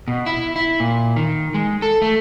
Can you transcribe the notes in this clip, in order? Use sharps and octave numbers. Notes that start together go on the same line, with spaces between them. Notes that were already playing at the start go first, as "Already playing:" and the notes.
B2
E4
E4
A#2
D#3
G#3
A4
A3